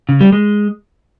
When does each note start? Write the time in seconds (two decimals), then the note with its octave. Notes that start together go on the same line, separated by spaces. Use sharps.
0.09 C#3
0.21 G3
0.32 G#3